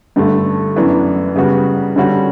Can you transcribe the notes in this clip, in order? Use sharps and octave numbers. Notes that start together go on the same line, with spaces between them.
G2 D3 A3
F#2 E3 B3 D4
C#3 G3 B3 F#4
D3 G3 C#4 F#4